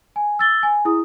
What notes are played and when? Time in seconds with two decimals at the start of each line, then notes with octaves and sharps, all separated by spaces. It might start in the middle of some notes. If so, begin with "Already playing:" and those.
0.16 G#5
0.39 E6 A6 G7
0.63 G#5
0.85 E4 G#4 D#6